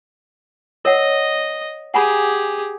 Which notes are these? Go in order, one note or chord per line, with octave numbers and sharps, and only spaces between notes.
A#4 C#5 D#5 F#5
G4 G#4 F#5 G#5 B5